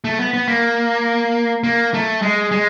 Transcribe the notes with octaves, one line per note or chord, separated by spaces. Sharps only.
A3
B3
B3
A#3
A#3
A3
G#3
G#3